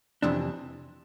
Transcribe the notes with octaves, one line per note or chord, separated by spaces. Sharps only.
F2 C3 E3 D4